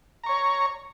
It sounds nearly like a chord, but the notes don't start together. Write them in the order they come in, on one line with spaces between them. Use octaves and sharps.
A#5 C#6 C#5